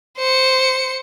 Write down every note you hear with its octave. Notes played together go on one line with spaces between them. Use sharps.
C5 C#7